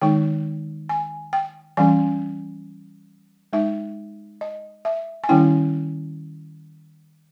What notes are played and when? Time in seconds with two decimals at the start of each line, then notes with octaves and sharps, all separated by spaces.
0.01 D#3 G#3 D#4 G5
0.89 G#5
1.33 G5
1.77 E3 G3 C#4 G#5
3.53 G#3 D#4 E5
4.41 D#5
4.85 E5
5.24 G#5
5.29 D#3 G3 C#4 E4 G5